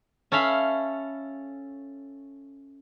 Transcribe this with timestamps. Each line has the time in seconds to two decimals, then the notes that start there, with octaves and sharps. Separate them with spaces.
0.32 C#4 A4 E5 F5 B5